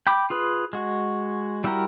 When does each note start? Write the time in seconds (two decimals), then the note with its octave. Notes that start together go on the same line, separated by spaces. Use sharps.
0.07 G5 B5 D6
0.30 F4 G#4 B4
0.73 G#3 F#4
1.64 G3 E4 F#4 G4 A#4